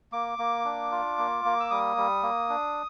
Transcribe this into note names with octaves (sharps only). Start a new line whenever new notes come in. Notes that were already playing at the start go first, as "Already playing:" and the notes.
A#3 D6
A#3
D4
F4
A#3
A#3
E6
G3 D#6
G3
A#3
D4